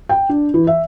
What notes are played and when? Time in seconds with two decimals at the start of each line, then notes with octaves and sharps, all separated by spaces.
0.09 G5
0.29 D4
0.54 E3
0.67 E5